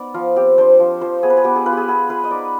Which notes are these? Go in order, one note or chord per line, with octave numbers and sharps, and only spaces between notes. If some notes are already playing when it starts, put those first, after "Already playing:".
Already playing: B3 D#4 D5
F3 F4
C4 G4
D4 C5
F3
F3 C5
B3 G#4
B4
G#4
B3 G4
G#4
F4 B4
G4 G#4
B3 G#4
F4 B4
D#5
D#4 D5